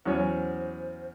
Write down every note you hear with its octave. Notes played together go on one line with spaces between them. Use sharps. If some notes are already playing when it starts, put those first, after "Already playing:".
E2 F#3 C#4 C5